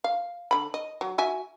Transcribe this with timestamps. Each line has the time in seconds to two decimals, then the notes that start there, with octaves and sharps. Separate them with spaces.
0.04 F5
0.51 D3 B5
0.74 D#5
1.01 F#3
1.18 F#4 E5 G#5